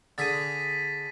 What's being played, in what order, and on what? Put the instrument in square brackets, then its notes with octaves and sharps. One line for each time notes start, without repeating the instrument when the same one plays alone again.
[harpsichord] D3 G#4 [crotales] A6 B6 D#7